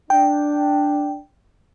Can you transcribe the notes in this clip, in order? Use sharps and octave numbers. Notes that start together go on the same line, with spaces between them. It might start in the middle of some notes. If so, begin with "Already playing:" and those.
D4 G5